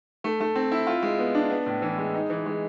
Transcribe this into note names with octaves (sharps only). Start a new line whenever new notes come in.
A3
A3
C4
E4
F4
G#3
B3
D4
B3
A2
E3
G#3
D#4
E3
G#3